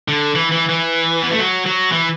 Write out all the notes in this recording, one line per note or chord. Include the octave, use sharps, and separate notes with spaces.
D3
E3
E3
E3
B3
A3
F#3
F#3
E3